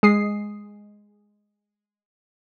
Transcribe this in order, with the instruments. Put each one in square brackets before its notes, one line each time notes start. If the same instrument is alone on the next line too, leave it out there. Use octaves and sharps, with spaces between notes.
[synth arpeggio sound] G#3 D#6 C7